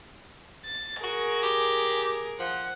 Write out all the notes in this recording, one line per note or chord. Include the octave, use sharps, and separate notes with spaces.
A6
F#4 G#4 A#4
G4
F3 F#5